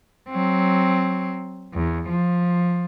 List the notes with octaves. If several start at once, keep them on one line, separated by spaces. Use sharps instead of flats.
F#3 C4
E2
F3